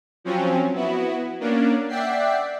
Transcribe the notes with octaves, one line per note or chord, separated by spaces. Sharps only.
F3 F#3 C4 C#4
B3 E4 F#4
A#3 C#4 D4
D5 E5 F#5 G5 B6 C7